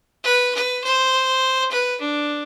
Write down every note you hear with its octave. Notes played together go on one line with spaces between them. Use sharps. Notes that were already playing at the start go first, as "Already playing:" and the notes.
B4
B4
C5
B4
D4